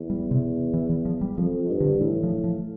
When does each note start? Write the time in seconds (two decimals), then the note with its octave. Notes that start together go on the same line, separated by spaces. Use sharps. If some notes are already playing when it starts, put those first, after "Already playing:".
Already playing: E2
0.10 G3
0.31 C3
0.74 E3
0.89 E3
1.05 F3
1.21 G3
1.37 F2 F3
1.70 G2
1.80 D3
2.01 A2 E3
2.23 F3
2.44 F3